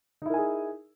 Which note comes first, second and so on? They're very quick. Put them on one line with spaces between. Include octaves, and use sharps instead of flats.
D#4 E4 A#4 G#5 G#4